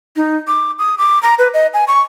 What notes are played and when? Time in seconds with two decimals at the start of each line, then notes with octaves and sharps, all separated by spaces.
0.16 D#4
0.47 D6
0.79 D#6
0.98 D6
1.23 A#5
1.39 B4
1.54 D#5
1.74 G#5
1.88 C#6